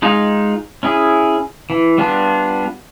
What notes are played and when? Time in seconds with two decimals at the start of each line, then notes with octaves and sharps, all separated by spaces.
0.02 G#3 D#4 F4
0.83 C#4 E4 G#4
1.70 E3
1.98 G3 B3 D4 F4